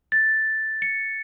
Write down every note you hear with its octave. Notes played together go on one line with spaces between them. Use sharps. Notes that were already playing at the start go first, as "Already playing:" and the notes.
A6
C#7